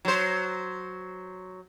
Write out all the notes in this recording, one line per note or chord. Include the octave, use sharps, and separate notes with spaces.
F#3 C5